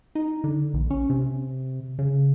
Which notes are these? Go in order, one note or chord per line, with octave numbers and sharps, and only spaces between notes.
D#4
D3
A#1
C#4
C3
C#3